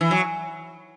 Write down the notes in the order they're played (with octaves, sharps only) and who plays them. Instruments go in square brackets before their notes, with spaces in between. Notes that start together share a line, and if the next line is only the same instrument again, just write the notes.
[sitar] E3
F#3